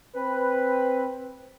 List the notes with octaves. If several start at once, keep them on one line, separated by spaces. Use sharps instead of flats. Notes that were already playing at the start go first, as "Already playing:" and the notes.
C4 B4